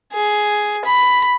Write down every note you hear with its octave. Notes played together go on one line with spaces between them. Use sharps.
G#4
B5